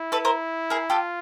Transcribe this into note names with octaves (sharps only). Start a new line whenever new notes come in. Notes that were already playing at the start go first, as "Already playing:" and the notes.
Already playing: E4
A4 B4
A#4 C5
G#4 A#4
F4 G4 A4